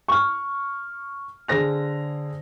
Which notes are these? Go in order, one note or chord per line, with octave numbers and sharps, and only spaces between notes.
C#6 F6
D3 G#4 C5 A#6 F7